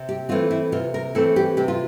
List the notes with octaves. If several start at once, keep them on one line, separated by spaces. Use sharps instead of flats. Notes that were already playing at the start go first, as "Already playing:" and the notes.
Already playing: C3
G4
E3 A3 C4 F4
E4
C3 F4
A#4
E3 A3 C4 A4
G4
C3 G4
F4